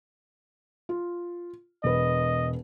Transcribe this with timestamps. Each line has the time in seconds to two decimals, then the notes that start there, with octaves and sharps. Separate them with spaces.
0.89 F4
1.84 E1 B4 D#5